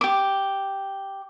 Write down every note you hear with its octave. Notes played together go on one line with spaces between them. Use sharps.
G4 D6